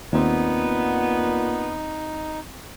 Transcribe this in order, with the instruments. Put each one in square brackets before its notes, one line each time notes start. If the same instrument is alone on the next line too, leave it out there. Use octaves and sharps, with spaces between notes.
[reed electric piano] D#2 C4 [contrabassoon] A#2 [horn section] B3 [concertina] D#4